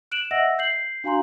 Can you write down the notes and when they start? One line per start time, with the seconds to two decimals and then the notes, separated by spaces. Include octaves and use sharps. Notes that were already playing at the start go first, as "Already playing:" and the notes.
0.11 F#6 D7 E7 F#7
0.31 D#5 E5 F#5 E6 A#6
0.58 G6 C7 F#7
1.04 D4 F#4 F5 G#5 A#5 C6